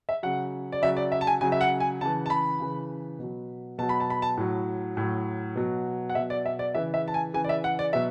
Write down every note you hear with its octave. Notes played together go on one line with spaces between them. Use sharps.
E5
C#3 F#3 F#5
D5
C#3 F#3 E5
D5
E5
A5
G#5
C#3 F#3 G#5
E5
F#5
G#5
C#3 E3 A5
A5
B5
C#3 E3
B2 F#3
B2 F#3 A5
B5
A5
B5
A5
A2 F#3
A2 F#3
B2 F#3
F#5
B2 F#3 E5
D5
E5
D5
C#3 E3 E5
E5
A5
G#5
C#3 E3 G#5
D5
E5
F#5
D5
B2 F#3 E5